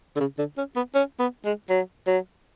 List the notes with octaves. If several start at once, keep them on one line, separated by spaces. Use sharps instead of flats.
D3
C#3
D3
C#4
B3
C#4
B3
G#3
F#3
F#3